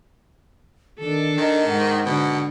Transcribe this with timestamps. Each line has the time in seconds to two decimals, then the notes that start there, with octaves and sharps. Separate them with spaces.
1.00 D#3 D4 A4
1.38 D#3 D#5
1.68 G#2 F#5
2.05 B2 D3